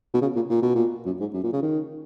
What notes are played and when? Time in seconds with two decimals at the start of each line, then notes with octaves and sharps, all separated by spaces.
0.14 B2
0.22 C#3
0.36 A#2
0.50 A#2
0.62 B2
0.75 A#2
1.06 F#2
1.20 G#2
1.34 F#2
1.43 A#2
1.53 C#3
1.62 D#3